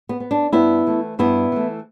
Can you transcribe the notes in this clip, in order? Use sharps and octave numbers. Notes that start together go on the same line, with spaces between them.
B3
B3
D4
G2 B3 E4
E3 A3
G2 B3 E4
E3 A3